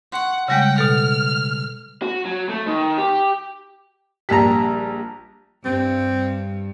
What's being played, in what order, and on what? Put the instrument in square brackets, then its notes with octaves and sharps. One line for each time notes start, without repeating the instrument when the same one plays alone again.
[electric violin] F#5 [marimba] C6 C#6
[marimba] C#3 G3 G#3 [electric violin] F#5 G5
[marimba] B2 A4 [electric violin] F6
[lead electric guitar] F#4
F#3
A3
D#3
G4
[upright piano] A#1 A5 B6 [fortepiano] G3 A#5
[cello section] G2 [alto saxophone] C4